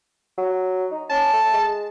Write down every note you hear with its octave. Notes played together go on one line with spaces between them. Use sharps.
F#3
D#4
C#4 A5
A3
G#3